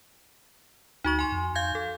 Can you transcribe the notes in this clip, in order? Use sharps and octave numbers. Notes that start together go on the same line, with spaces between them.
D2 D#4 F#4 C#6
G#5 C6
F2
F5 G6 G#6
A4